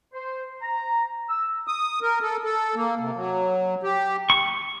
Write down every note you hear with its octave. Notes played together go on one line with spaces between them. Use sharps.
C5
A#5
E6
D#6
A#4
A4
A4
A#3
C3
F#3
G4
C#6